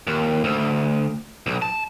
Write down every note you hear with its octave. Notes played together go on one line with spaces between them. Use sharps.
D#2
D2
B1
A5